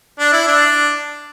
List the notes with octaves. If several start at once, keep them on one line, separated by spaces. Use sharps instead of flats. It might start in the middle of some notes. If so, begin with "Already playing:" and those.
D4
E4
D4